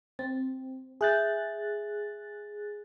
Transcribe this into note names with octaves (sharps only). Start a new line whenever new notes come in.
C4 A6
G#4 E5 F#6 G6 A6